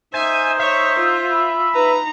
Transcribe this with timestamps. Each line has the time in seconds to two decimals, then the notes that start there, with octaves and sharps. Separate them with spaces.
0.14 D#4 C5 E5 G#5
0.59 C#5 E5
0.99 F4
1.31 B5
1.75 D#4 B4 A#5